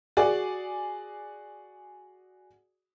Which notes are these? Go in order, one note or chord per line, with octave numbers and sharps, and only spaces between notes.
F#4 G#4 D5